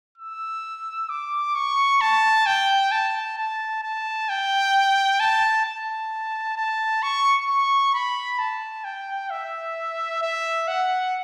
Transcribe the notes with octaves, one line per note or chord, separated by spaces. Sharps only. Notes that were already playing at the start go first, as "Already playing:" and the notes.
E6
D6
C#6
A5
G5
A5
A5
A5
G5
A5
A5
A5
C#6
C#6
B5
A5
G5
E5
E5
F#5